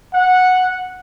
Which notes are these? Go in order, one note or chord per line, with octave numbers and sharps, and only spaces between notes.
F#5